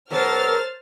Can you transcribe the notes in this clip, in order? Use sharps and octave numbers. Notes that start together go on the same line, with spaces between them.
B2 F#3 G#3 A#4 C5 F6 A6